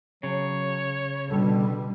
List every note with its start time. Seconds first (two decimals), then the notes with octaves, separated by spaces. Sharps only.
0.23 C#3 F#3 C#5
1.30 B2 D3 G3 A4